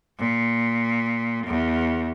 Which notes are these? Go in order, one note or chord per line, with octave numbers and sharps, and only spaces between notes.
A#2
E2